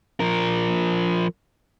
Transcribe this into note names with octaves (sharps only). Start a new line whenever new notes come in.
F3 A#4